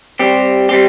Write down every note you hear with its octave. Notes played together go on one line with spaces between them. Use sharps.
G3 C4 G4
G3 C4 G4